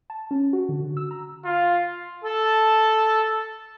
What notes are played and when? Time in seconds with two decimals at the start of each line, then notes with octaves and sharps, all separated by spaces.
0.10 A5
0.31 C#4
0.53 F#4
0.69 D3
0.83 D3
0.97 E6
1.11 A#5
1.45 F4
2.24 A4 A5